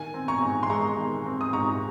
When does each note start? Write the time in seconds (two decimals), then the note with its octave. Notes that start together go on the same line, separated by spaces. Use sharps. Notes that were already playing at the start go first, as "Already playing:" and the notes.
Already playing: D#3 G#5
0.14 C4
0.28 A#5 C#6
0.42 G#2
0.63 C6
0.70 G#3 A#5 C#6
0.98 D#3
1.26 C4
1.41 D#6
1.53 G#2 A#5 C#6